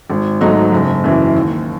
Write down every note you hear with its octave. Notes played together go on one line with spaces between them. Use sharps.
G#1
G#2 F#3 A3 D#4
F#1
F#2 E3
D#2